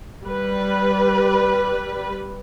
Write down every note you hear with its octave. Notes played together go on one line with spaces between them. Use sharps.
G3 B4